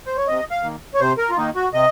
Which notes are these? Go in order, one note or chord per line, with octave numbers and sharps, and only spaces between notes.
C5
C#5
C3 D#5
F5
D#3 A#3
C#5
C3 C5
A#4
F4
D#3 A#3 D#4
F#4
C3 D#5